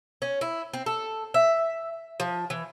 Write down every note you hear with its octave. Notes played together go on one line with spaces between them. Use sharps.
C#4
E4
C4
A4
E5
F3
E3